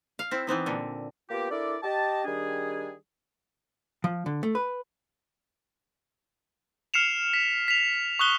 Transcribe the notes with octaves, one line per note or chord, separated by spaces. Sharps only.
F5
C4 E4
E3 B3 C4 D#4
A#2 D3
A#3 B3 F4 G4
D4 E4 A4 A#4 D5
G4 D#5 A5
D#3 G3 D4 G#4
F3
D3
A3
B4
F6 C7 C#7 E7 F7
B6
B6 F7
C#6 D#6 F#6 G7